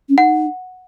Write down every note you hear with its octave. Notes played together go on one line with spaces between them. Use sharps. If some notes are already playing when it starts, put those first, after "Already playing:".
C#4
D#4 F#5